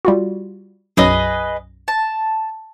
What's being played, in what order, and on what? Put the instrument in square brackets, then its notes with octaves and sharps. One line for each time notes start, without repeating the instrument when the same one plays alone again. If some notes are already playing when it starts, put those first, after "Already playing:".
[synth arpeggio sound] G3 F4 F#4
[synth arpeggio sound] B1 F#2 F#3 [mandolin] G#4 B4 D#5
[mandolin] A5